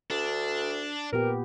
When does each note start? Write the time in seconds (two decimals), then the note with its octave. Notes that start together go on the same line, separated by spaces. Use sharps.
0.10 D2 D4
1.13 A#2 B3 G4 A#4